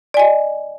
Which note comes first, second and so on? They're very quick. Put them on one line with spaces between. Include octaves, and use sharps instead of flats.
D5 G#5 D#5